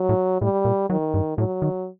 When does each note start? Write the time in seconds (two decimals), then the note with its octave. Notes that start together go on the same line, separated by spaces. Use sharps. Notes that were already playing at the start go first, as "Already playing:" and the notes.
Already playing: F#3
0.09 A2
0.41 A2 G3
0.65 A#2
0.90 D#3 F#3
1.14 G2
1.37 A2 F#3
1.62 D#3